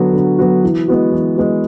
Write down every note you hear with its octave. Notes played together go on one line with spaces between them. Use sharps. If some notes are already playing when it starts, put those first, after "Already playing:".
Already playing: D3 F#3 B3 F#4
D3
F#3 B3 F#4
E3
G#3 B3 F#4
E3
G#3 B3 F#4